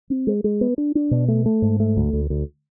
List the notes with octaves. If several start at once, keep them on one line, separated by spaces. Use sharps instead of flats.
C4
G#3
G#3
B3
D4
D4
B2
A3
A3
G#2
A3
D2
D2
D2